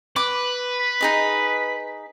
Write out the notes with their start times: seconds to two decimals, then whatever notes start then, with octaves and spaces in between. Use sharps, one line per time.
0.16 B4 D6
0.79 B6
1.01 D#4 G#4 D#5